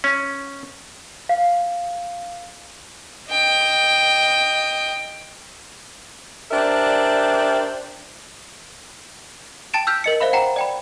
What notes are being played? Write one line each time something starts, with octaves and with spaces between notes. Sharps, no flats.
C#4
F5
D#5 G5
D4 G4 A#4 C5 D5 E5
G5 A5 A6 D7 E7
E6 F6 G6 B6 F7
A#4 D#5 C#7
C5 E5 F5 B5
F#5 G5 A#5
D5 G5 B5